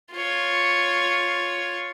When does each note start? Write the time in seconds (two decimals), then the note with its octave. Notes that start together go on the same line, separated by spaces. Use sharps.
0.13 F4 C#5